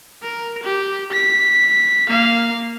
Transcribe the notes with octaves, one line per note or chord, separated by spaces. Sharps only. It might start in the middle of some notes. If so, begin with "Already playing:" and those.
A#4
G4
B6
A#3 F5